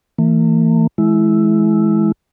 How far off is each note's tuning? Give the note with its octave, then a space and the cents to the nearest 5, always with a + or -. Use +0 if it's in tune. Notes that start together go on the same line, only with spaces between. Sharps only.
E3 +0 A#3 -45
E3 +0 G#3 +30 E4 +0